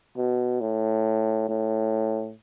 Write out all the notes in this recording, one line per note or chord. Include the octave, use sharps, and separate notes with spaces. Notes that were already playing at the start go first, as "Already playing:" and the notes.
B2
A2
A2